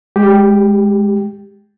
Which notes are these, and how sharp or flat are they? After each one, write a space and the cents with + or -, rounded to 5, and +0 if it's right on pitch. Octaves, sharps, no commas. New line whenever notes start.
G#3 +0 G4 +0